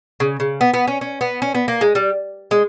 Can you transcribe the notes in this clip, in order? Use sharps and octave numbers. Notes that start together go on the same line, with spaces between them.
C#3
C#3
B3
B3
C#4
C#4
B3
C#4
B3
A#3
G#3
G3
G#3